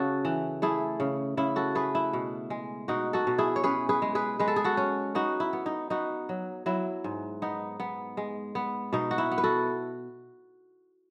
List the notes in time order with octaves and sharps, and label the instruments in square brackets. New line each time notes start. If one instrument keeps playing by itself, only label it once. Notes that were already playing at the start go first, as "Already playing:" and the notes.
Already playing: [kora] C#3 F#4 A4
E3
A3 E4 G#4
C#3
C#3 E4
F#4 A4
A3 G#4 B4
E4
B2
G#3
B2 D#4 F#4
F#4 A4
B2
E4 G#4
C#5
C#4 G#4 B4
G#4 B4
G#3
G#4 B4
G#3 B4
A4
G#4
F#4 A4
C#4
B3 D#4 F#4
E4
B3
D#4
B3 D#4 F#4
F#3
F#3 E4
G#2
B3 D#4
B3
G#3
B3
B2 D#4
F#4
E4
B3
B4
F#4 A4